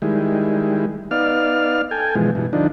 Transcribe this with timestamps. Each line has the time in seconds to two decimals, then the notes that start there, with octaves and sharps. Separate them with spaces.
0.02 D#3 G3 G#3 E4
1.11 B3 D#4 D5 F5 F6
1.91 A4 G5 G#5
2.15 G#2 B2 E3 F3 G#3
2.35 G2 B2 E3
2.53 D3 F3 D4 D#4